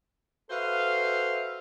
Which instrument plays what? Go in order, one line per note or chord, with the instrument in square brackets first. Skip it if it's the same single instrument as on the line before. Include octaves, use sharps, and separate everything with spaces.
[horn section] F#4 A4 B4 C5 E5 F5